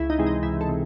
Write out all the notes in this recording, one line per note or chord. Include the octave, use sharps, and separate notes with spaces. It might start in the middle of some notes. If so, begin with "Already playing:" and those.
Already playing: C#2 E4
D#4
C3 E3 G#3
D#4
C#2 E4
A4
C3